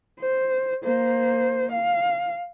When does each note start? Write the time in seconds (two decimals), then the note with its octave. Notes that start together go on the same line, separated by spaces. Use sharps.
0.20 C5
0.84 A#3 C5
1.72 F5